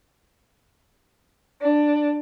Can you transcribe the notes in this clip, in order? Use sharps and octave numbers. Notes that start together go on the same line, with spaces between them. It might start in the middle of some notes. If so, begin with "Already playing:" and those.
D4